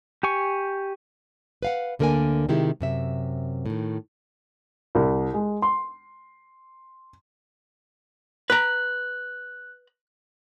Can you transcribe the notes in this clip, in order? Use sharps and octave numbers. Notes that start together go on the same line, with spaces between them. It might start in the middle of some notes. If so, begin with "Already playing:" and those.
G4 G#5 C#6
B4 F5 F#5
D2 D3 A#3 A#4 D5 G#5
C3 D#3 G#3 E4 G4
F#2 C3 E5
A2 D#3
C2
G#3
C6
B4 A#5 F#6